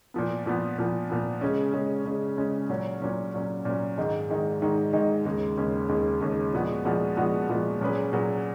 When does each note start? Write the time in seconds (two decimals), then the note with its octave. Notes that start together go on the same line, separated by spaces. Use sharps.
0.14 A#2 F3 B3
0.46 A#2 F3 B3
0.78 A#2 F3 B3
1.10 A#2 F3 B3
1.41 C#3 G#3 C#4
1.74 C#3 G#3 C#4
2.05 C#3 G#3 C#4
2.37 C#3 G#3 C#4
2.70 A#2 F#3 C#4
3.02 A#2 F#3 C#4
3.34 A#2 F#3 C#4
3.65 A#2 F#3 C#4
3.98 G#2 D#3 G#3 D#4
4.29 G#2 D#3 G#3 D#4
4.61 G#2 D#3 G#3 D#4
4.93 G#2 D#3 G#3 D#4
5.25 D#2 C#3 G#3
5.57 D#2 C#3 G#3
5.89 D#2 C#3 G#3
6.21 D#2 C#3 G#3
6.53 A#2 F3 G#3 B3 F#4
6.85 A#2 F3 G#3 B3 F#4
7.17 A#2 F3 G#3 B3 F#4
7.49 A#2 F3 G#3 B3 F#4
7.81 A#2 F#3 C#4 G#4 B4
8.13 A#2 F#3 C#4 G#4 B4